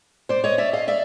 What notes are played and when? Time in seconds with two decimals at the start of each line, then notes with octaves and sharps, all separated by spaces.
0.29 C5 D5
0.44 C#5 D#5
0.58 D5 E5
0.73 D#5 F5
0.87 D5 E5